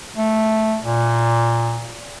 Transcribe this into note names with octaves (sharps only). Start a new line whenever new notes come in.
A3
A#2